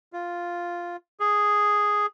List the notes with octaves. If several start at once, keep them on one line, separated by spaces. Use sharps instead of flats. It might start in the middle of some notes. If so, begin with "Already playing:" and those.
F4
G#4